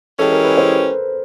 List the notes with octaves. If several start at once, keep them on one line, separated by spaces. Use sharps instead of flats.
E3 G#3 C#4 E4 G4 A4
A#4
B4
C5